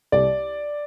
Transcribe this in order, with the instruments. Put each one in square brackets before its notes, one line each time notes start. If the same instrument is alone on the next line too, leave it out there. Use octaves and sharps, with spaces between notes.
[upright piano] C2 D5